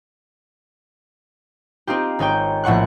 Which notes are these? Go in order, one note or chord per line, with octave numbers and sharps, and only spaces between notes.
C4 D#4 F4 G4
G#1 D#4 C#5 G5
A#1 A2 F#5 C#6 F#6